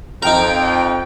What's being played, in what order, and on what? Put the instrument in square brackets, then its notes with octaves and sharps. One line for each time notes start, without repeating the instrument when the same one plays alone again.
[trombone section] F2 [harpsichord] D#4 A#4 [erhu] G5